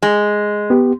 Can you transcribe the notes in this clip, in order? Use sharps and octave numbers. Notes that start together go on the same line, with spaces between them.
G#3
B3 G4